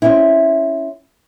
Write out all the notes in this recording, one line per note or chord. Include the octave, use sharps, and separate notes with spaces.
C4 C#4 E4